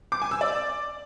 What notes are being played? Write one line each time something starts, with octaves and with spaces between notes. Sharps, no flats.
D6
G#5
E6
D5